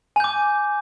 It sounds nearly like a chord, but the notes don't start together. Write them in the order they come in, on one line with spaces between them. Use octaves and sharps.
G#5 G6 D6